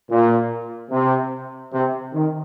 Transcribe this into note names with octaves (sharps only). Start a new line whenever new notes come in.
A#2
C3
C3
D#3